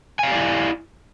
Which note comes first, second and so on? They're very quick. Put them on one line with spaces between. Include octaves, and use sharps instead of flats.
G#5 F5 G4 D5 E4